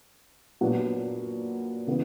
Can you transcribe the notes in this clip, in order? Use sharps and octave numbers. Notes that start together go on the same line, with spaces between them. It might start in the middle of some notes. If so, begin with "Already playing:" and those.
A#2 F#3 B3 D4
C#3 E3 B3